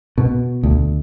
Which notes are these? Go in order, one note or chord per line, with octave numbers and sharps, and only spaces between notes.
B2
D2